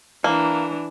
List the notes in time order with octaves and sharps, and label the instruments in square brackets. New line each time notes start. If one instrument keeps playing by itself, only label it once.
[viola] E3 D4 [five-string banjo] A#3